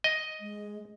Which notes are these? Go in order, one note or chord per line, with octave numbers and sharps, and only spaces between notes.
D#5
G#3